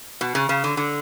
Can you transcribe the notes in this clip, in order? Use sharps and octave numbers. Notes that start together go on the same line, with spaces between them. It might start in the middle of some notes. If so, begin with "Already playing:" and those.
B2
C#3
C#3
D3
D3